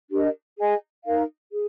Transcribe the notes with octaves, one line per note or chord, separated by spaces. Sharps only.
D4 G4 A#4 D#5
G#4 D#5 G#5
D#4 A#4 F5
G#4